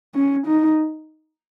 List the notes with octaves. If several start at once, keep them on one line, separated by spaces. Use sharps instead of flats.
C#4
D#4